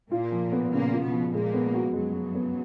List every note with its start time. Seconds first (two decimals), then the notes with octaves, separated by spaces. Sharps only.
0.11 A#2 A#3 F4
0.31 F3
0.52 B3
0.72 A#2 C#3 A#3
0.93 F4
1.02 B2 B3
1.12 F3
1.33 A#2 G#3 A#3
1.54 B3
1.74 F#4
1.94 F#2 F#3 G#3
2.14 G#3
2.35 B3